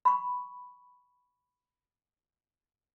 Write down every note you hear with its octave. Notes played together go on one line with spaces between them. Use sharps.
B5 C#6